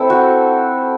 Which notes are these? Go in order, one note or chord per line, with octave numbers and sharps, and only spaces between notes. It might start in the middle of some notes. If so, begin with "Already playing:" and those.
Already playing: C4 E4 A4
F#4